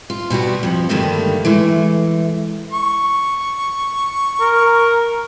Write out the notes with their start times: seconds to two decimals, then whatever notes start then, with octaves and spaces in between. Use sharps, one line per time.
0.10 F4
0.30 B2 G3 B3 F#4
0.63 F2 F3
0.89 G2 D3 D#3 G3 A3 A#3
1.45 E3 G#3 A3
2.73 C#6
4.40 A#4